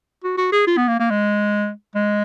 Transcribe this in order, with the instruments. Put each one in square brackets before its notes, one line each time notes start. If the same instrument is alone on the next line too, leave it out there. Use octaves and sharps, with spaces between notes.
[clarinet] F#4
F#4
G#4
F4
B3
A#3
A#3
G#3
G#3